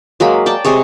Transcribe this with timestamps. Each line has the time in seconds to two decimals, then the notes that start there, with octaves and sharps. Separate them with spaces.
0.20 F#3 G#3 A#3 B5
0.46 D5 G5 A5
0.65 C3 G#3 G#4 C#5